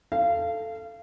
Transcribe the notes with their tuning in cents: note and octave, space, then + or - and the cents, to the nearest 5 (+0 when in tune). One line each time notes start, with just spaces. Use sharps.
A4 +5 F5 -25